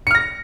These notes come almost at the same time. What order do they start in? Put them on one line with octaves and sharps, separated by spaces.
C#7 F6 A#6